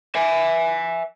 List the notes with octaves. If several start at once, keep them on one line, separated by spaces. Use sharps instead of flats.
E5 G#5